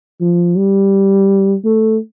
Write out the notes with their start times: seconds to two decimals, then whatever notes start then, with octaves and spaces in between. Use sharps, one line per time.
0.21 F3
0.56 G3
1.65 A3